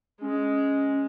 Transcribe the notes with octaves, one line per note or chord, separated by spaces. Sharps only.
G#3 C#4